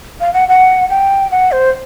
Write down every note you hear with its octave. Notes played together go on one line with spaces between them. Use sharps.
F5
F#5
F#5
G5
F#5
C5